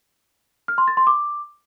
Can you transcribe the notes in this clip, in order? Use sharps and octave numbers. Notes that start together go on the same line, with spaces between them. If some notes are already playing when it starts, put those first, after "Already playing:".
F6
C6
A6
C6
D6